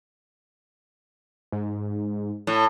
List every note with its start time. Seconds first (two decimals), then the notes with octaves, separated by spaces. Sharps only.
1.52 G#2
2.47 A2